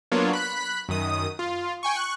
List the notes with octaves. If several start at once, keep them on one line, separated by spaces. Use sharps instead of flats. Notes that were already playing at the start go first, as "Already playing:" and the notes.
F#3 A#3 B3 D4 F4 C#5
B5 F#6 B6
F#2 D#3 D#6
F4
G5 G#5 C#6
C#6 F#6